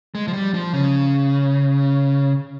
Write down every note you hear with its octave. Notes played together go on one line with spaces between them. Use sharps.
G#3
F3
G3
F3
C#3